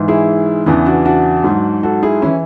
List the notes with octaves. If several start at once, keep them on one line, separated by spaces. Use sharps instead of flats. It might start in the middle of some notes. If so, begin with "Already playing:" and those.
Already playing: G#2 E3
E4 G#4
E2 C#3 E3 B3 D4
D4 F#4
D4 F#4
G#2 F#3
F#4 A4
E4 G#4
E3 C#4 E4